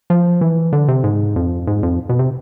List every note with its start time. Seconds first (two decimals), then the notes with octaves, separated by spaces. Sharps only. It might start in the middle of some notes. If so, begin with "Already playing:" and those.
0.10 F3
0.41 E3
0.73 D3
0.88 C3
1.04 G#2
1.36 F2
1.67 G#2
1.83 F2
2.09 B2
2.19 C3